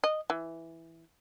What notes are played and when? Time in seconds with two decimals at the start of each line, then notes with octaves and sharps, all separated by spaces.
0.04 D#5
0.30 E3